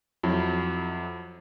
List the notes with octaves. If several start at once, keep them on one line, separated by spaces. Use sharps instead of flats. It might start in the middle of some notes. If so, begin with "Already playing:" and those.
F2 F#3 E4